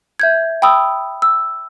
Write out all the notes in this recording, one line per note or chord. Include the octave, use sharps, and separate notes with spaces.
E5 G6 G#6
G5 B5 D#6 E6
E6